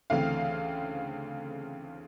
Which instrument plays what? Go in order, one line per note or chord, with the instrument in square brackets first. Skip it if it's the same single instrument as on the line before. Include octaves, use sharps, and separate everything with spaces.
[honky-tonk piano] D2 C#3 E3 A3 C4 F5